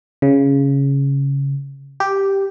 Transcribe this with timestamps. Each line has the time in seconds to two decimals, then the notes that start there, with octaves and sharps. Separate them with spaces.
0.22 C#3
2.00 G4